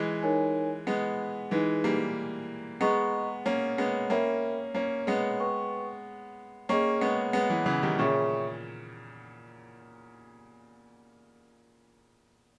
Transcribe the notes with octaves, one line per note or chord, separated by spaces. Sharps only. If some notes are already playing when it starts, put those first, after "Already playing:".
Already playing: E3 G#3
D#4 A#4 C#5 G#5
G#3 B3
E3 G#3 D#4 G#4 B4
G3 A#3
G#3 B3 G#4 D#5 A#5 C#6
A#3 C#4
G#3 B3
A#3 C#4 A#4 E5 G5 B5
A#3 C#4
G#3 B3
B4 G5 C#6
A#3 C#4 G#4 D#5 G5 C#6
G#3 B3
G#3 B3
E3 G#3
C#3 E3
D#3 G3
A#2 C#3 G#4 C#5 E5 G5 C#6